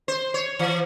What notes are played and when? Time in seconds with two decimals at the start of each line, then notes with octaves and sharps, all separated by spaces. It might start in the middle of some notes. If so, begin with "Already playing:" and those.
0.08 C5
0.34 C#5
0.59 E3